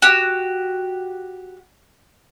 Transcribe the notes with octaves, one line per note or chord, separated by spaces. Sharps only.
F#4 G4